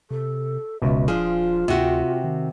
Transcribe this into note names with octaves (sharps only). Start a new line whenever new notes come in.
C3 A4
D#1 C#2 B2 E5
D#1 F3 D4 F4 G#4
D2 C3 F#4 G4
D#3